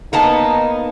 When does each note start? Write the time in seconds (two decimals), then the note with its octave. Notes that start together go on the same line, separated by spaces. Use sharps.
0.13 A#3 B3 D#4 A5